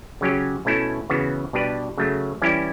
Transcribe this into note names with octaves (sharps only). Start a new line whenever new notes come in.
C#3 F#3 C#4 G4
B2 A3 C#4 E4 A4
C#3 E3 B3 F#4
B2 G3 D4 G4 B4
C#3 F#3 A3
E3 G3 C#4 E4 G4